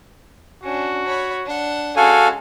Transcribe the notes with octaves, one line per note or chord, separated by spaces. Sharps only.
C#4 D4 F#4
C#5 B5
D4 F#5
G#3 C#4 F#4 A4 F5 G#5